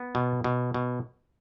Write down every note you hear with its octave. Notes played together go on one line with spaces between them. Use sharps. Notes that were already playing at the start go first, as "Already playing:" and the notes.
Already playing: B3
B2
B2
B2